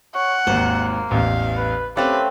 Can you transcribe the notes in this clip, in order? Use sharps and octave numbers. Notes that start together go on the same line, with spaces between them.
C#5 F#5
G#1 D#2 A#3 C5
A1 E2 F5
B4
A3 C4 C#4 G4 B4 F5 A6